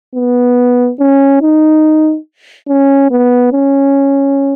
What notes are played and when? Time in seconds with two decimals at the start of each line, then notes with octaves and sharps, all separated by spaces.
0.15 B3
1.00 C#4
1.41 D#4
2.68 C#4
3.11 B3
3.53 C#4